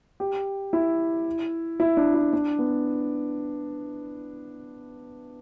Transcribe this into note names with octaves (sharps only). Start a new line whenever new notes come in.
G4
E4
E4
D4
E4
D4
B3